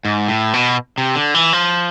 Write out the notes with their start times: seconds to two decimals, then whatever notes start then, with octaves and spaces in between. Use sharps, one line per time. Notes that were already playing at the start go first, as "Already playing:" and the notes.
0.05 G#2
0.28 A2
0.53 B2
0.98 C3
1.15 D3
1.34 E3
1.53 F3